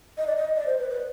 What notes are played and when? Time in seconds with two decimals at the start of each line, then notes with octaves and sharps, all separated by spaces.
0.18 D#5
0.27 D5
0.36 D#5
0.56 D5
0.66 C5
0.79 B4
0.90 B4